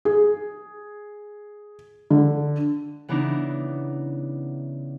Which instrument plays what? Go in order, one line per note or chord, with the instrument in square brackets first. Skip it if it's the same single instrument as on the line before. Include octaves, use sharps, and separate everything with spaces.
[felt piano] G#4
D3
[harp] C#3 E3 B3 D4 D#4